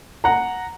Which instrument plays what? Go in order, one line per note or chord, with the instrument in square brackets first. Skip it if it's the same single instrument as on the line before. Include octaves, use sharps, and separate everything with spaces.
[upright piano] F#5 A#5